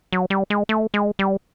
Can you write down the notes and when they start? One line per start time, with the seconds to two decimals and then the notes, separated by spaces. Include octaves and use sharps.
0.13 F#3
0.30 G3
0.50 G#3
0.69 A3
0.94 G#3
1.19 G3